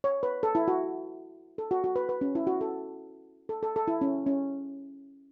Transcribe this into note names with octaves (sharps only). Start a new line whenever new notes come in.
C#5
B4
A4
E4
F#4
A4
F#4
F#4
B4
B4
C#4
E4
F#4
A4
A4
A4
A4
E4
C#4
C#4